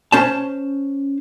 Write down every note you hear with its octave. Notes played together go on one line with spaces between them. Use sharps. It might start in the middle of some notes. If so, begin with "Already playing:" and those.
C#4 C5 A5